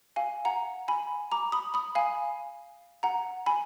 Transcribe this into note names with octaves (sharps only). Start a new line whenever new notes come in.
F5 G#5
F#5 A#5
G#5 B5
A#5 D6
B5 D#6
B5 D#6
F5 G#5
F#5 A#5
G#5 B5